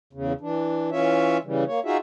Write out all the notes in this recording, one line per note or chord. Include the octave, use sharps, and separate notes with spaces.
E2 C#3
E3 D4
E3 C#4 F4 C#5 E5
C#3 E3 G3
A#3 C#5
D#4 F4 F#4 G#4 E5